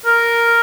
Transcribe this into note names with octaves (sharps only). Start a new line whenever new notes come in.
A#4